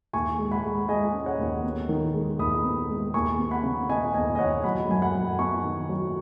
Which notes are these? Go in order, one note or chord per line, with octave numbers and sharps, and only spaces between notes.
D#2 G#5 C#6
G#3
F#5 B5
G#3
G#3 D#5 G#5
C#4
C#5 F#5
D#2
B3
D#3
G#3
D#2 B5 D#6
B3
G#3
D#2 G#5 C#6
B3
F#5 B5
C#3
B3 D#5 G#5
D#2 D#5 G#5
D#5
D#2 C#5 F#5
F#3 F#5 B5
F#2 G#5
F#5 B5
F#2
B3 G#5 C#6
D#3
F#3